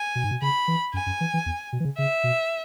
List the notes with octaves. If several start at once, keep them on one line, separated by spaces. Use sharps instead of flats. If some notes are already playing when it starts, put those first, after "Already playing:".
Already playing: G#5
B2
G#2
B2
C#3 B5
E3
F#2 G#5
F#2
E3
E3
E2
B2
E3
C#3
C#3 E5
B2